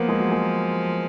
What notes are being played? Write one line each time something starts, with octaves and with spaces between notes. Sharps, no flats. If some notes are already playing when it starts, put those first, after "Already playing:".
Already playing: F3 A#3 B3
G#3
F#3
G#3